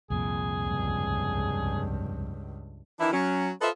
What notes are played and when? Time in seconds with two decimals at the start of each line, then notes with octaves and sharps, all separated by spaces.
0.10 C2 F2 A#2 G#4
0.62 C#2 G2
3.00 D#3 E3 D4 E4
3.13 F#3 C#4
3.62 F4 A4 B4 C5 D#5 E5